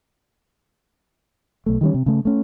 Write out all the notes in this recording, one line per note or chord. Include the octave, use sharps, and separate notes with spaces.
B1 A3
D#3 G3 C#4
C3
C#3 A3
A3 C#4